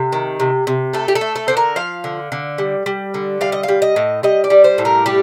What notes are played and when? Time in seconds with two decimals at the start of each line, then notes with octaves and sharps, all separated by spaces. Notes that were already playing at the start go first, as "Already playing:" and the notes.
Already playing: C3 A4
0.13 D#3
0.40 C3
0.67 C3
0.93 A3 A4
1.08 G4
1.15 A4
1.21 A3
1.36 A4
1.48 D3 C5
1.57 A#4
1.76 F3 F5
2.04 D3
2.32 D3
2.58 G3
2.86 G3
3.14 D3
3.41 G3 F5
3.52 D#5
3.63 F5
3.68 G3
3.82 D#5
3.96 A2
4.23 G3 D#5
4.44 D5
4.50 G3
4.64 C5
4.78 A2
4.85 A#4
5.06 G3 G4